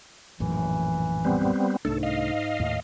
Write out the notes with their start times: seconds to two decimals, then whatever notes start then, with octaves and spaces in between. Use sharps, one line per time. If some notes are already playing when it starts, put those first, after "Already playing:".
0.40 A#1 F#2 A2 E3
1.25 G3 B3 C4
1.85 C2 G#2 A3 D4 A4
2.03 D#5 F5
2.59 D#2 A2